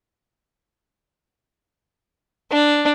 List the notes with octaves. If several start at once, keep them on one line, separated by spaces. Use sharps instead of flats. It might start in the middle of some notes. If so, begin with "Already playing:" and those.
D4